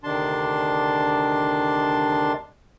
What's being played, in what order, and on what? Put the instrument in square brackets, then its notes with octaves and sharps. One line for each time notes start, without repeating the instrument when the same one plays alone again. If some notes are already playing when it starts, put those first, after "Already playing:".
[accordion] D2 C3 D#3 D4 A5 C6